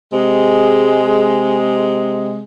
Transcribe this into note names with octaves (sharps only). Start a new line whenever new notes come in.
C3 G#3